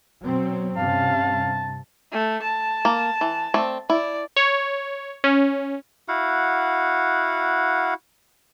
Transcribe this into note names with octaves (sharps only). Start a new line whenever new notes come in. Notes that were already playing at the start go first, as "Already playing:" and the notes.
B2 F#3 C4
G2 C3 C#4 F5 A5
A3
A5
A#3
E3
A3 C4 D5
E4 D5
C#5
C#4
E4 F#4 F5 F#5